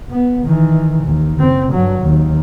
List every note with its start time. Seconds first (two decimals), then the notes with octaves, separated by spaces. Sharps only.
0.10 B3
0.45 D#3 E3
1.04 D#2
1.39 F#1 C4
1.72 G2 F#3
2.01 D#2